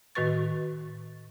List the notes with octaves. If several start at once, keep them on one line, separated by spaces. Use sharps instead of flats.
A2 D#3 F#4 B4 C#6 A6